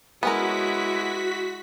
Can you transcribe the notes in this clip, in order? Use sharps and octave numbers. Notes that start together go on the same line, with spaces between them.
G#3 B3 C#4 E4 F#4 A#4 B6